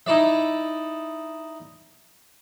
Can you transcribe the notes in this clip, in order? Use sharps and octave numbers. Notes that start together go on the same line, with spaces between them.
D#4 E4 D5 E5